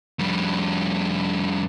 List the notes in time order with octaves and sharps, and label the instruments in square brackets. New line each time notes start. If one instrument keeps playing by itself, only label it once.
[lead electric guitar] F2 G3